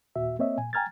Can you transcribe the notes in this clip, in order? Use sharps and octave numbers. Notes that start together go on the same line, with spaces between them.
D#2 A#2 F#4 E5
A#3 C4 C#5 D#5 E5
A#2 G#5
G5 G#5 A#5 F6 G#6 A6